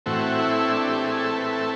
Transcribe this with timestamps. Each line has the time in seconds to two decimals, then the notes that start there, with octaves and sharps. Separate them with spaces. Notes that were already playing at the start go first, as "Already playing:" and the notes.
0.06 A2 E3 A3 C4 F#4
0.39 E4
0.72 D4
0.88 G4
1.05 G#4
1.20 A4
1.37 B4
1.53 A4